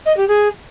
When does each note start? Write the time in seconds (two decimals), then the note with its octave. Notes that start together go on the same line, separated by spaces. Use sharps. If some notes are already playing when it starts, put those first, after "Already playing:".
0.05 D#5
0.16 G4
0.28 G#4